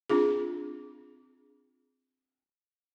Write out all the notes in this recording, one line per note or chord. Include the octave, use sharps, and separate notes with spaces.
C4 D4 F4 G#4